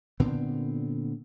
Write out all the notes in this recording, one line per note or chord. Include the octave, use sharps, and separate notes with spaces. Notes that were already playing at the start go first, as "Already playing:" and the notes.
A#2 D3 B3 C4